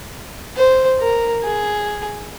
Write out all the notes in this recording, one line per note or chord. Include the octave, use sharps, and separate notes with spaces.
C5
A#4
G#4